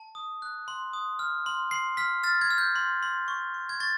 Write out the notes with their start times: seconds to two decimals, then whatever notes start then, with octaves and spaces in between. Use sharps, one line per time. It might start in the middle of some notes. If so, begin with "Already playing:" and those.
Already playing: A5
0.15 D#6
0.42 F#6
0.68 C6
0.93 D#6
1.19 F6
1.46 C6
1.71 C6 C7
1.97 F6 B6
2.23 F6 A6
2.41 G#6
2.51 F6
2.58 G6
2.76 C6
3.03 C6
3.28 C#6
3.54 C#6
3.69 G#6
3.80 C#6 A6